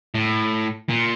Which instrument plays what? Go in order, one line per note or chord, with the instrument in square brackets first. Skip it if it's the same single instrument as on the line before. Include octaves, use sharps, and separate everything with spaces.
[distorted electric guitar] A2
A#2